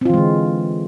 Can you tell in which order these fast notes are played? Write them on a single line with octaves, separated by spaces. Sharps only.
C4 F4 E3 G#3 D3